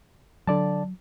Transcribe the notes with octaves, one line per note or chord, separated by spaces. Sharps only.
D3 F#3 D5 A5